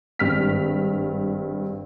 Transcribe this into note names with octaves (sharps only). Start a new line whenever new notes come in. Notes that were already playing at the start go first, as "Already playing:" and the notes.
G#1 G2 F6 B6